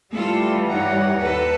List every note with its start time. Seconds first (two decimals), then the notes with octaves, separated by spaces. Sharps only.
0.12 E3 G3 A3 F4 A4
0.68 G2 D#4 C#5 F#5 A#5
1.19 D#2 A4 B4